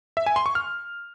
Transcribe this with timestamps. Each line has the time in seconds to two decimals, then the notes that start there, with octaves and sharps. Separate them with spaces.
0.17 E5
0.26 G#5
0.36 C6
0.46 C#6
0.55 F6